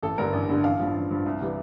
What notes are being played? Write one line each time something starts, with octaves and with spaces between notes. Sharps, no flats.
A1 A4
G2 D3 G3 A#4
A1
G2 D3 G3
A1 F5
G2 F3
A1
G2 F3
C2
C3 E3 G3